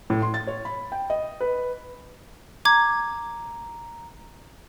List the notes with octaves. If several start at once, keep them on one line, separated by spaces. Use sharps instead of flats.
A2
C6
A6
C#5
B5
G5
D#5
B4
A#5 D6 G#6